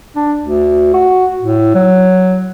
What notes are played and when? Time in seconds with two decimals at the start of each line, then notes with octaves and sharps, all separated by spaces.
0.16 D4
0.41 D2
0.94 F#4
1.43 A2
1.75 F#3